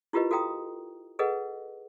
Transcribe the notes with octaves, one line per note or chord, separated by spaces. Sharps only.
E4 F4 G4 A#4 B4 D#5
F#4 A4 F5 G5 A#5 D#6
G#4 A4 B4 D#5 F#5